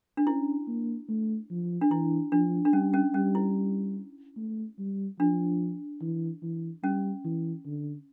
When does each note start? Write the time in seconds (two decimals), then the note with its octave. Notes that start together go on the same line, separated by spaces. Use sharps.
0.17 D4
0.27 C#4 E4
0.68 A#3
1.09 A3
1.50 F3
1.81 D4
1.91 E3 E4
2.32 F3 D4
2.65 D4
2.73 G3 C#4
2.94 C#4
3.14 G3 C#4
3.35 E4
4.37 A3
4.79 G3
5.19 F3 D4
6.01 E3
6.42 E3
6.83 G3 C#4
7.25 E3
7.66 D3